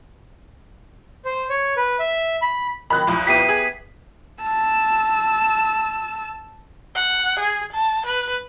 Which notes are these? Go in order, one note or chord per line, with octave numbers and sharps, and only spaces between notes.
C5
C#5
B4
E5
B5
D#3 F#3 C4 B5 F#6
C2 F2 C6
B3 E4 G4 B6 C7 D#7
G#4
A5 E6
F#5
G#4
A5
B4